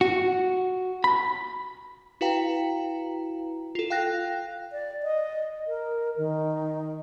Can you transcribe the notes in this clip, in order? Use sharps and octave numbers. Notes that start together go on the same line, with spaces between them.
F#4
B5
E4 F#4 B4 F5 G5 A#5
F4 A4
F5 G5 F#6 A#6
D5
D#5
A#4
D#3